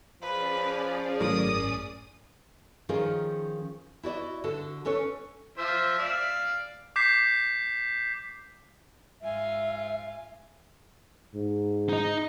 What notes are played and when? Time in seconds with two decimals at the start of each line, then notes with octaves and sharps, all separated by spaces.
0.22 F3 C#4 G#4 B4 D5
1.20 G#1 F#2 A2 A#4 D#6
2.89 D#3 F3 C#4 F4 G#4 A#4
4.03 E4 F#4 D5 D#5
4.44 D3 F#4 A4
4.85 C#4 A4 B4 C#5
5.58 F3 C5 E5
5.99 D5 F5
6.96 D6 G6 B6 C7
9.22 G#2 F4 E5 G#5
11.35 G#2
11.89 D#4 D#5